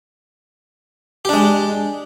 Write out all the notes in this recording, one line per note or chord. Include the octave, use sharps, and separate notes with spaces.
G#3 D4 G4